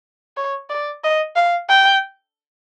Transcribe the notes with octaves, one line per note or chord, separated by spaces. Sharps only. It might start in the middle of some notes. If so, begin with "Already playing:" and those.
C#5
D5
D#5
F5
G5